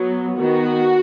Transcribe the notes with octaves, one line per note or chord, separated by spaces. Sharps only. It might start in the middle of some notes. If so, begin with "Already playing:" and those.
Already playing: F#3 B3
D#3 B3 F#4